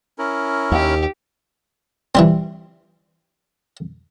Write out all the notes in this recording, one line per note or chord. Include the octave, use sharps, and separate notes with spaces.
C#4 E4 A#4
D#2 G4
E3 G3 C4